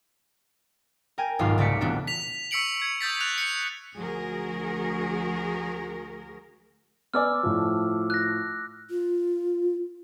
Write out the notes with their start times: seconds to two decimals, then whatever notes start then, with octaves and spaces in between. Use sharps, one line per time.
1.18 A#4 G5 G#5
1.39 D#1 B1 G#2 F4 F5 C6
1.58 C2 C#3 A3 D5 B6 C#7
1.81 E1 A#2 B3 D4
2.07 B6 F7
2.51 C#6 E6 B6 C#7 D7 F#7
2.82 G#6 B6
3.01 D#6 E6 G6 A6 B6
3.20 F#6 F7
3.38 C#7
3.96 D2 F3 F#4 G#4 A#4
7.14 B3 D5 G#5 D6 E6 F6
7.43 A2 F3
8.10 F#6 A#6
8.90 F4